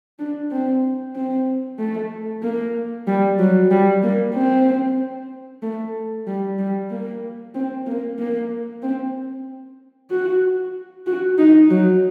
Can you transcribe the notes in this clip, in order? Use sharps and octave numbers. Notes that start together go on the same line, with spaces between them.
D4
C4
C4
A3
A#3
G3
F#3
G3
A#3
C4
A3
G3
G3
A#3
C4
A#3
A#3
C4
F#4
F#4
D#4
F#3